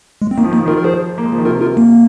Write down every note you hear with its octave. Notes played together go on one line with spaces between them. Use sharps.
G#3
C4
D#3 A#3
F3
D#3 A#3
F3
D#3 F4 A#4
A#4
F3 G#4 C5
A#3
G#3
F3
D#3
C3 F4 A#4
F4 A#4
A#3